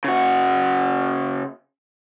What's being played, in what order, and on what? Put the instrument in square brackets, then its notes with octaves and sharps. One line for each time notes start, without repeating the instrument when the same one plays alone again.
[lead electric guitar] C#3 F#4